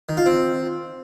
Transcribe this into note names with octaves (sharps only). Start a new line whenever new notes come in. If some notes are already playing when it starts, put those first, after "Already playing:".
D#3
F4
C4